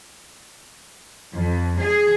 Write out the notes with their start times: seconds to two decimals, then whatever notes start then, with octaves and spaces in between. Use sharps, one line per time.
1.34 F2
1.79 G#4